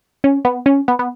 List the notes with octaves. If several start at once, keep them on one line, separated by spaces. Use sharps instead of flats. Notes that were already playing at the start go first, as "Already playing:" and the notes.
C#4
B3
C#4
B3
B3